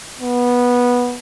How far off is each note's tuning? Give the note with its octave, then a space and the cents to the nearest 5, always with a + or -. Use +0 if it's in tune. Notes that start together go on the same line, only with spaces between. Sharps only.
B3 -15